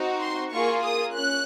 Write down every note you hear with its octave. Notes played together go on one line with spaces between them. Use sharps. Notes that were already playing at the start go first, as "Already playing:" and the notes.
Already playing: C4 D#4 F#4
C6
A#3 F4 G#4 C#6
D#6
C#4 F#6